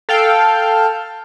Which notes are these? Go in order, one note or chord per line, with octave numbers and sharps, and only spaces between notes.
A4 F5 G5